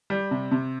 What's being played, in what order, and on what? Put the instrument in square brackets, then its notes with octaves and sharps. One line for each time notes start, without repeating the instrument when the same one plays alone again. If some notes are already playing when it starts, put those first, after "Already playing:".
[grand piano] G3
C3
C3